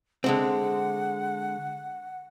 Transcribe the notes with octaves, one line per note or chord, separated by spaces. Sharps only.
D3 G#3 C4 F#5